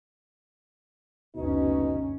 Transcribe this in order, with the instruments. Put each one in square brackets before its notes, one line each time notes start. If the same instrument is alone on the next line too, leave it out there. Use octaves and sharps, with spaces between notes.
[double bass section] F#1 D2 C#4 [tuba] B2 [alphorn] D#4